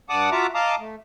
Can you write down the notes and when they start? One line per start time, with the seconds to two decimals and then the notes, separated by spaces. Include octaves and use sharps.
0.09 G2 D5 F#5 A5 D6 D#6
0.32 F4 F#4 E5 A5 A#5 D6
0.55 D#5 F5 A5 A#5 D6 D#6
0.79 A3